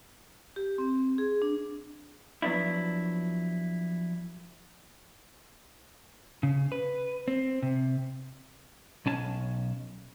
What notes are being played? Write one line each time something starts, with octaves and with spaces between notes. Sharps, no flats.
G4
C4
G#4
D4
F3 F#3 B3 D4 E4
C#3
B4
C4
C3
B1 C#4 A5